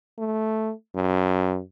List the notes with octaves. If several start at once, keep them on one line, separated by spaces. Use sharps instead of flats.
A3
F#2